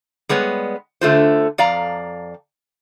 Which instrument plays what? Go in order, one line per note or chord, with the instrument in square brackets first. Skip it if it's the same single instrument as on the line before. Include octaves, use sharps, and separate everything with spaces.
[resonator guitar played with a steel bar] G3 G#3 B3 C#5
D3 A3 F4 C5
F2 D5 F5 A#5